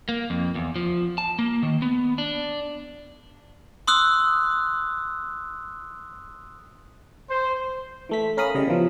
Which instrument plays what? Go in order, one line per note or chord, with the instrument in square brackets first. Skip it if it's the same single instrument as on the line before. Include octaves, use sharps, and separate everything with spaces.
[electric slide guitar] A#3
F2
E2
F3
A5
A#3
D#3
B3
D4
[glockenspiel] C6 D#6 E6 F#6
[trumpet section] C5
[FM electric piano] E3 A3 B6
C#4 A#4 F5 B5 D#6
C#3 G3 D#5
B2 E3 F3